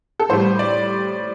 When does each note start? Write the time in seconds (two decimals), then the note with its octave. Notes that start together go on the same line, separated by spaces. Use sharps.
0.20 A4
0.29 A2 G3 C5
0.59 D5